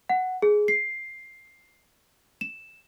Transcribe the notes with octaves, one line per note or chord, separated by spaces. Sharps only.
F#5
G#4
C7
E7